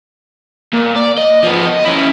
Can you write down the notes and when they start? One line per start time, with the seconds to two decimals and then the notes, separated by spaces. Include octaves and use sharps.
0.73 A#2
0.96 D5
1.18 D#5
1.44 F3 B3
1.66 D#5
1.85 C#4 E4